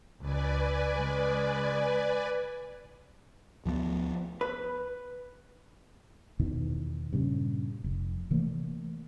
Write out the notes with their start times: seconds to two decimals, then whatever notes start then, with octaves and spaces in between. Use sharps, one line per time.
0.21 C#2 B4 D5 G#5
0.94 C#3 G#3
3.65 D2 F3 G3 B3
4.41 B4
6.39 E2 B2 D#3 E3
7.13 G2 A#2 C#3
7.84 F1
8.31 C3 E3 A3 A#3